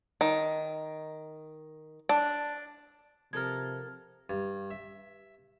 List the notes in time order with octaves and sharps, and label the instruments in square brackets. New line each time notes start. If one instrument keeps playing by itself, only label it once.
[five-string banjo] D#3
D4
[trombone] C3 [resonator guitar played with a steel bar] F3 A4 A#4 [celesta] F6 G#6
[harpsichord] G2
E5